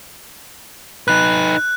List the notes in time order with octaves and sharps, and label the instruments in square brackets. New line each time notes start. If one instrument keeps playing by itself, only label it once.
[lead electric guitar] D#4 B4 [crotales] F#6